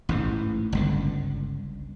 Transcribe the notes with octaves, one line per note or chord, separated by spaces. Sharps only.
A1 G#2 E3
G1 C#2 D3